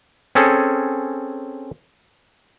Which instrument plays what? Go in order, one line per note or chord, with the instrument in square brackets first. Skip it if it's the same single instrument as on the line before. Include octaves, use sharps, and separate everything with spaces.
[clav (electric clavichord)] C4 C#4 G#4 A4